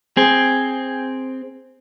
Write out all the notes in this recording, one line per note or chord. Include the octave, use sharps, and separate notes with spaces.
C4 G#4